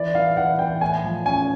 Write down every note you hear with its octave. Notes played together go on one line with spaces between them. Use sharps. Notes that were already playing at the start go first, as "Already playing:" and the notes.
Already playing: E3 D5
E3 F5
E3 F#5
E3 G5
A2 G#5
F3
C#4 G#5